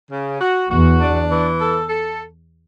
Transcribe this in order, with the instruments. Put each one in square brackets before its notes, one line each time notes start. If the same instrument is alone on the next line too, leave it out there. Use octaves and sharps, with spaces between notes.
[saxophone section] C#3
F#4
[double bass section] E2 [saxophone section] F#4
[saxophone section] D4
E3
A4
A4